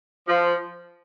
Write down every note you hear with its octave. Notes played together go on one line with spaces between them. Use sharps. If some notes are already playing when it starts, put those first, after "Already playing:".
F3